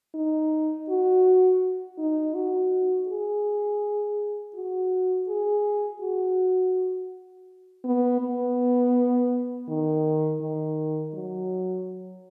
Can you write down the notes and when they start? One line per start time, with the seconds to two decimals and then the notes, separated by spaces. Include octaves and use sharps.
0.14 D#4
0.89 F#4
1.98 D#4
2.34 F#4
3.08 G#4
4.55 F#4
5.28 G#4
6.01 F#4
7.85 B3
8.21 B3
9.68 D#3
10.41 D#3
11.14 F#3